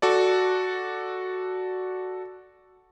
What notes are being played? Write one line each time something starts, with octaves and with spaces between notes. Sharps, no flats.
F#4 A4 D5